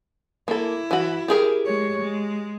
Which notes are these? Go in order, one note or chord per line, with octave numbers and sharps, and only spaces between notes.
A#3 E4 A4
E3 F#4
G4 G#4 A#4
G#3 C#5
G#3